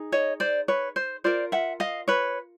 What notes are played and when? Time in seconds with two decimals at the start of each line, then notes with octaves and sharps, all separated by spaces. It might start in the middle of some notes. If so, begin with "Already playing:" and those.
Already playing: D#4 G#4
0.12 C#5 D#5
0.40 C5 D5
0.68 B4 C#5
0.96 C5
1.24 F4 A#4 C5 D5
1.52 E5 F#5
1.80 D#5 F5
2.08 B4 C#5